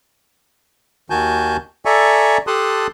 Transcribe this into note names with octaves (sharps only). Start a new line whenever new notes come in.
D#2 D#3 F#4 G#5 A5 G6
A4 D5 E5 G#5 A#5 C#6
G4 A4 A5 C6 D#6 F#6